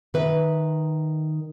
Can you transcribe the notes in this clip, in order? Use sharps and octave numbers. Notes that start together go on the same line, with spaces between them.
D#3 B4 E5